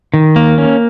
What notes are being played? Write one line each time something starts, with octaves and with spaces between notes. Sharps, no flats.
D#3
A#3
C#4